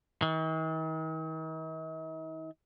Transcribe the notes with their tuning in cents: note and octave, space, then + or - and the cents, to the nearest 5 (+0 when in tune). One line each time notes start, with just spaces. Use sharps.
D#3 +45